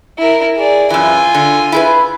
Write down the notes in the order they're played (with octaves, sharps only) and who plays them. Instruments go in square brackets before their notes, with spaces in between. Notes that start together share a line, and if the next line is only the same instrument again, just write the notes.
[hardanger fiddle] E4 A#4
G#4 D5
[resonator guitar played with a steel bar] F#2 E3 [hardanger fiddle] F4 G#5
[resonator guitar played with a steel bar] D3
E4 G#4 B4